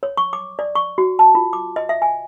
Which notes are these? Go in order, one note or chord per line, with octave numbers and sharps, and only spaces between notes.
C#5
C#6
D6
D5
C#6
F#4
A5
F4
D6
D#5
E5
G#5